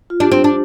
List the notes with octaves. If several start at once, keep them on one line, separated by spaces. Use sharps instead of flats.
F4
D4 G4
C4
D4